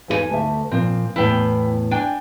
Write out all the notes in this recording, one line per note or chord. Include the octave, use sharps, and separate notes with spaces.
E2 G#4 G#5
D2 E5
A#2 F3 C4
E2 A2 B3 E4 F5 G5
D4 G5 G#5